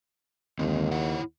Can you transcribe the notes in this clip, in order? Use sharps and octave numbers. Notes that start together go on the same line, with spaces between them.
D#2 D3 G#3 C4
E4 C#5 F#5